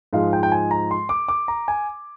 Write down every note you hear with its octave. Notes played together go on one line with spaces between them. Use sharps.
G#2 F3 G#3 F5
G5
G5
G#5
A#5
C6
D6
D6
A#5
G#5